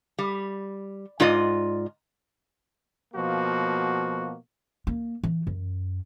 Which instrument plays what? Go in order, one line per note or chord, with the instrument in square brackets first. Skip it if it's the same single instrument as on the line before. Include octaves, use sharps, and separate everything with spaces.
[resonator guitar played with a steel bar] G3
G#2 F4 D5 D#5
[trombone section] B2 F3 A#3 F#4
[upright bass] A#3
E3
F#2